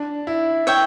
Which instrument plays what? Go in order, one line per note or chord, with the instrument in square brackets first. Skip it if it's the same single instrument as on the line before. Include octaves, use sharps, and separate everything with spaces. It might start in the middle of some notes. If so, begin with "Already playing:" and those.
Already playing: [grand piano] D4
E4
[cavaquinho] C#5 E5 G5